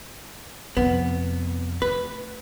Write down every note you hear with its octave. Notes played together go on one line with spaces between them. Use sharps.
F2 C3 B3
A3 B4